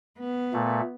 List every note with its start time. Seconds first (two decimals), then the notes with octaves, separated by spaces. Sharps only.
0.19 B3
0.53 A#2 A3